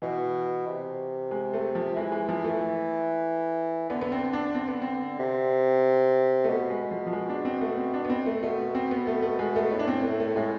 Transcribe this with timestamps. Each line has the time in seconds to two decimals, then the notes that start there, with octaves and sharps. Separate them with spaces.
0.02 B2 E3
0.67 C3
1.31 G#3
1.53 A3
1.75 F3
1.96 E3 G#3
2.12 G#3
2.29 F3
2.45 A3
3.90 D3 B3
4.01 B3
4.12 C4
4.33 D4
4.55 C4
4.68 B3
4.82 C4
5.19 C3
6.44 A3
6.48 B2 B3
6.70 G#3
6.91 F3
7.07 F3
7.13 G#3
7.29 D4
7.45 C4
7.61 A3
7.77 C4
7.94 D4
8.05 B3
8.10 C4
8.26 A3
8.43 B2 A3
8.75 C4
8.91 B3
9.07 A3
9.22 A3
9.39 G#3
9.56 A3
9.71 A2 B3
9.79 D4
9.88 C4
10.04 A3
10.20 A3
10.36 A2 G#3